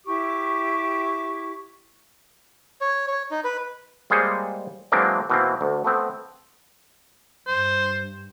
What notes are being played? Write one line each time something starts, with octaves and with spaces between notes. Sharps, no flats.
E4 G4 C#6 D6
C#5
C#5
D#4
B4
G3 G#3 A#3 G#4 C5 C#5
E3 F#3 G#3 A#3 C4 D4
B2 E3 A#3 C4
D2
A3 B3 C4
G2 C5